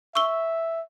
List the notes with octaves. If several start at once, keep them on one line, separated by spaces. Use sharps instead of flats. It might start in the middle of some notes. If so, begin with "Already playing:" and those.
E5 C#6 E6 G7